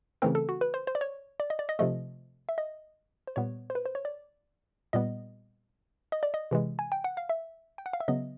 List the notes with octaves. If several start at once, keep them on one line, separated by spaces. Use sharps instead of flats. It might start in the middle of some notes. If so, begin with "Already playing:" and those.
C#3 E3 A3 C4 A#4
A4
F#4
B4
C5
C5
D5
C#5
D5
D#5
D5
D#5
C3 F3 A3 D#5
E5
D#5
C5
A#2 G3 B3 C#5
C5
B4
C5
C#5
D5
A#2 G3 B3 D#5
D#5
D5
D#5
C3 E3 G#3
G#5
G5
F#5
F5
E5
G5
F#5
F5
E5
C#3 F#3 B3 D#5